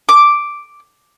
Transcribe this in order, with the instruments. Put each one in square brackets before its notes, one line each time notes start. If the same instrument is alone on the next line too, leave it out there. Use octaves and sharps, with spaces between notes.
[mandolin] D6